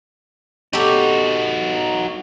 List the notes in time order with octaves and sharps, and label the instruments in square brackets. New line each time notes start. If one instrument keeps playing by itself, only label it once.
[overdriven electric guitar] D#4 F#4 [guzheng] G4 A4